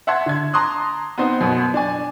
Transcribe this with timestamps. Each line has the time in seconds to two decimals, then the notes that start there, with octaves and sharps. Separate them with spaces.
0.07 E5 F#5 A5 C6 G#6
0.26 D3 G#6
0.53 A5 A#5 C6 D6 D#6 F#6
1.18 B3 C4 D#4 C5
1.41 F#2 B2 B3
1.74 D4 D5 G#5